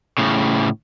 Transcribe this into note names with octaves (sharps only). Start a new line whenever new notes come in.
A2 C#3